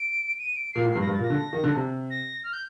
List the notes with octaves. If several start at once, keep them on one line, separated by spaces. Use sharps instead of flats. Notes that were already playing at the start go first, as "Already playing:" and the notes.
Already playing: D7
D#7
D7
A#2 C7
A2
G2 C7
A#6
G2
A6
A#2
A#6
D3
D#3
D3
C3
A#6
F6
G6